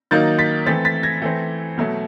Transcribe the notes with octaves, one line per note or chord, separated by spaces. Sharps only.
D#3 F#3 A#3 D#4 G6 A6
A6 B6
E3 A3 C4 A6 B6
A6 B6
G#6 A#6
E3 A3 C4
B2 F#3 A3